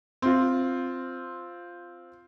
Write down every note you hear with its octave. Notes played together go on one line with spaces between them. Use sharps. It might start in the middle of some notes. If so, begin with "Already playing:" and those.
C4 F4